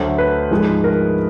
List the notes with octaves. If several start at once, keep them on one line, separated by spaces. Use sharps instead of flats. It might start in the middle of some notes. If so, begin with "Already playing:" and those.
Already playing: D2 D3 F#3 A3 C5
B4
G#2 F3 G#3
A#4